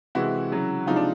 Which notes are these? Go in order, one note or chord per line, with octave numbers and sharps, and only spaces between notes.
C3 E3 G#3 E4 F#4
C#3 F#3
C3 F3 G#3 D#4 F4
D4